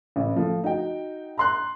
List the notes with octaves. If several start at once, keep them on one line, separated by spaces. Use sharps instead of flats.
A1
F3 A3
D#4 F#4 G5
A#5 C6 F#6